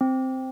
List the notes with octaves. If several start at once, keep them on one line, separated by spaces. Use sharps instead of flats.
C4